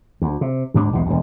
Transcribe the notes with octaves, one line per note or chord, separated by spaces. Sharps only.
D2
C3
D2 G#2 D4
B1 E2 G#2 B2
E1 D2